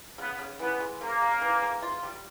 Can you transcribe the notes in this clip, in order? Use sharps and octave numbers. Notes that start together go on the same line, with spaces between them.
C#3 B3
C#3
E3 B3
G#3
C#3 A#3
C#3
E3
G#3
F4
G3